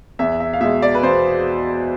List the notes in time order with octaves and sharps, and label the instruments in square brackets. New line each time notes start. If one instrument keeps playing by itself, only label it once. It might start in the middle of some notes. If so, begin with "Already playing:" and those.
[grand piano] E2 E5
E5
F5
B2 G#3 E5
D5
B4
E2 C5